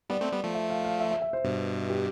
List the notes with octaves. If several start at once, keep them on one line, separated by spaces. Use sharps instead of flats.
G3 B3 D5
A3 C4
G3 B3
F3 A3
E5
F5
F5
E5
E5
E5
C5
G2 B2
G4